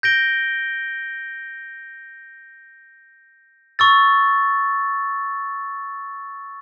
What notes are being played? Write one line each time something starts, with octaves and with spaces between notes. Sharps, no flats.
G6 A#6 D7 G7
C#6 E6 A6